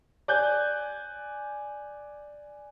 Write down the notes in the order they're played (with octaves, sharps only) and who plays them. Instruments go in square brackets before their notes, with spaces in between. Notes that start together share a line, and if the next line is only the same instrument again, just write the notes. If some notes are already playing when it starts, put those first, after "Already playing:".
[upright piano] D5 G#5 F#6 G6